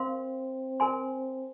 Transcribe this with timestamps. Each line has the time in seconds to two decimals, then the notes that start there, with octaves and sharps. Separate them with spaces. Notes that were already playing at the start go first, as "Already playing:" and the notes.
Already playing: C4 A#4 F5 C6
0.80 A#4 G#5 C6